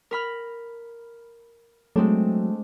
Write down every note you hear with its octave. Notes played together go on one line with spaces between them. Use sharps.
A#4 B5 F6
F#3 G#3 A3 C4 D4